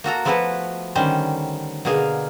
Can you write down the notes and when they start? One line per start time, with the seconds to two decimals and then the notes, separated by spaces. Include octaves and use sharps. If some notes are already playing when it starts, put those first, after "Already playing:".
0.04 A#3 F#4 A4 A#5
0.25 F3 A3 B3 E4 F#4 B4
0.95 D3 D#3 G3 C#4 C5
1.85 B2 D3 A#3 G#4 F5